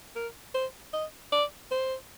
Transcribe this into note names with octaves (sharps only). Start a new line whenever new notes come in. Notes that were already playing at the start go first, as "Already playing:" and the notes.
A#4
C5
D#5
D5
C5